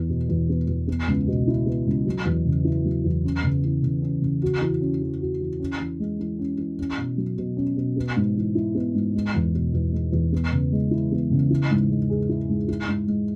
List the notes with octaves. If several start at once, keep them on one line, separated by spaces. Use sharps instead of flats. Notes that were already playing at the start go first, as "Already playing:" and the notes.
Already playing: E2 B3
B2
E2
B3
E2
B3
C#2
B2
E4
B3
C#2
F#3
E2
C#3
E4
F#3
E2
C#4
C#3
E3
C#3
C#4
C#3
F#4
E3
C#4
E3
F#4
E3
C#4
E3
G#3
E3
C#4
E3
C#4
B2
F#3
B2
C#4
B2
B3
G#2
E3
E4
B3
G#2
G#3
E2
B2
E2
G#3
E2
B3
C#3
G#3
E4
B3
C#3
E4
G#2
G#3
G#4
E4
G#2
E4
G#2
G#3